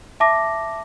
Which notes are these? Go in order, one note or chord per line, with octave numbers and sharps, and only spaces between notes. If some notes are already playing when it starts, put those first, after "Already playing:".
E5 A5 D6 A#6